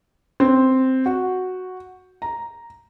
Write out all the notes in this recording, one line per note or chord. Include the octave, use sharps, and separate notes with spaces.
C4
F#4
A#5